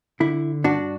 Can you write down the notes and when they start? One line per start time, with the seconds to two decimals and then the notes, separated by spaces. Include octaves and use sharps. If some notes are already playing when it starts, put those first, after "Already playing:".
0.20 D3 E4
0.64 G2 D4 F#4